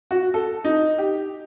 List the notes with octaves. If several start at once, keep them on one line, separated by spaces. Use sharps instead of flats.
F#4
A4
D#4
G4